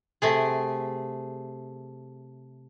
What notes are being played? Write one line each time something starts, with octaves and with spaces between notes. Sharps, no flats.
C3 A3 G#4